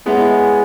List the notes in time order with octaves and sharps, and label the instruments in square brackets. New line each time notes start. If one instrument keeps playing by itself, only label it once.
[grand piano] G#3 B3 [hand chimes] E4 G#4 C#5 E5 G#5